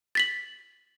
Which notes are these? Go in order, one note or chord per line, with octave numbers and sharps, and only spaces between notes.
A6 B6 F#7